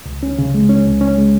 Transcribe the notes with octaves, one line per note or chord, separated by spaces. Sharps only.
C#2
C#4
C#3
G#3
C#4
C#2
C#4
G#3